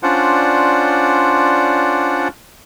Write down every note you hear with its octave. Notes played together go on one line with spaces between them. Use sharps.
C#4 D4 F4 C5 D5 F#5